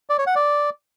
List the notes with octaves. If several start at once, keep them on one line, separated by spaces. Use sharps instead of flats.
D5
C#5
F#5
D5